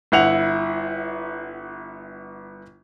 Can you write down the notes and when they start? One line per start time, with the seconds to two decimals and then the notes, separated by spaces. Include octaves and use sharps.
0.12 G1 E4 F#5 F7